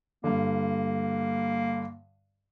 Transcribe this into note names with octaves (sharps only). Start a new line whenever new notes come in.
G2 D3 A#3